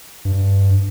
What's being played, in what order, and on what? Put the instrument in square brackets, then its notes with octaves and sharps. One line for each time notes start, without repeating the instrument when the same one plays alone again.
[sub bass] G2